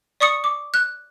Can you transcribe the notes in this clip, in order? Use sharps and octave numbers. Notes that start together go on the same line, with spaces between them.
D5 C#6 D#6 C#7
D6
F#6